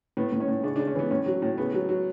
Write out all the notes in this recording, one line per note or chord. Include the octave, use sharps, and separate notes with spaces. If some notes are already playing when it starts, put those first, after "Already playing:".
A2 B3
A2
C#4
A2
C#3 D4
D4
C#3
C#4
E3 B3
A2 C#4
F#3
A2
C#3 B3
F#3
F#3